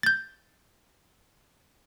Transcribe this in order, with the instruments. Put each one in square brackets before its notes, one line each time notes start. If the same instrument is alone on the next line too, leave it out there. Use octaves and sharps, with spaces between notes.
[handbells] G6 A6